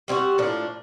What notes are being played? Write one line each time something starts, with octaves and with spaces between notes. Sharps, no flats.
G3 C4 D#4 F#4
A2 F3 A#3 D4